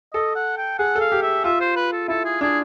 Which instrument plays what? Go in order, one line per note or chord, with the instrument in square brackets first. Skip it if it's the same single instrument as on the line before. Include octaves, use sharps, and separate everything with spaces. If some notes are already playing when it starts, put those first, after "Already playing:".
[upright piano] A4 [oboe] D#5
[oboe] F#5
G5
[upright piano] G#4 [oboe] F#5
[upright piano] A4
[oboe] F5
[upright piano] G4
[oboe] E5
[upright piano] F4 [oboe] E5
[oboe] C5
B4
A4
[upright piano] E4 [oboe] A4
[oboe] G#4
[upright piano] D4 [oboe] G#4